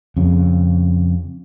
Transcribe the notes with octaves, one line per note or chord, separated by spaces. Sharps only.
F2 C#3